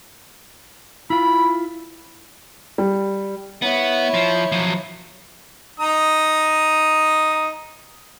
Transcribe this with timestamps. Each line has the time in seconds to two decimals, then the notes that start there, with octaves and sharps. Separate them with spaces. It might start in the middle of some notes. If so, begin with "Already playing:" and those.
1.10 E4 F4 B5
2.78 G3
3.62 B3 E4 C#5
4.14 F3
4.52 F3 F#3
5.80 D#4 A#5 D#6